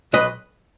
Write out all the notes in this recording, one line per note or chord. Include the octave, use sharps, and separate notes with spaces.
B1 B4 D#5